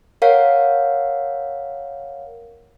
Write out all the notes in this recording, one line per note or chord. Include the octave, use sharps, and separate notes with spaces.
A#4 C#5 F5 F#5